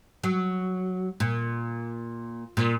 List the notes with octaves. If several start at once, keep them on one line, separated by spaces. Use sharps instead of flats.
F#3
A#2
A#2